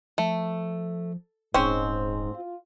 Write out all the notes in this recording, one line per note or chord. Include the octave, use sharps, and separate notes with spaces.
F3 A3
D#1 G#2 C4 C#4 C5
F4